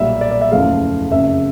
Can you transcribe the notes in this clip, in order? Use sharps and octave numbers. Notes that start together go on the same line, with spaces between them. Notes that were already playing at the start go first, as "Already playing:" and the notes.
Already playing: B1 A#2 G3 A#3 E5
D5
D5
E5
F#1 E2 C#3 F3 A3 F5
F#1 F2 C#3 E5